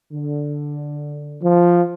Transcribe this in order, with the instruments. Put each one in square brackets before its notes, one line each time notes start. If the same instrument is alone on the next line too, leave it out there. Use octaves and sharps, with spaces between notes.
[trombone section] D3
F3